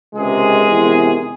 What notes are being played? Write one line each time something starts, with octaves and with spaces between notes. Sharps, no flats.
C#2 C3 D#3 G#3 G#4
E2 C3 D#3